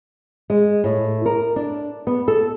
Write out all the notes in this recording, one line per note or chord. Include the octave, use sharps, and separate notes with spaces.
G#3
A2
A#4
D4
B3
A4